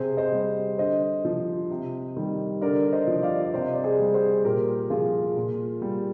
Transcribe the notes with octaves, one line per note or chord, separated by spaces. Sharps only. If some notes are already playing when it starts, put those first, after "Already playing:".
Already playing: C3 G#4 C5
C5 D#5
G3
D3 C5 D#5
F3
C3
D#3 G3
D3 A#4 D5
C5 D#5
F3
D5 F5
D5
C3 C5 D#5
D5
G#4 C5
G3
G#4 C5
A#2 G4 A#4
F3 F4 G#4
A#2
G3